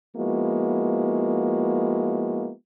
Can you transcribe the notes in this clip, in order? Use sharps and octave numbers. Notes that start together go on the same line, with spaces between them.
F3 G#3 A#3 B3 E4 F#4